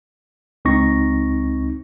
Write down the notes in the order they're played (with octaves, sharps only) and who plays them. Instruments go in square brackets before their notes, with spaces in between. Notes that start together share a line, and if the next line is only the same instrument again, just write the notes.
[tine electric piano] C#2 C4 D#4 C#6 A#6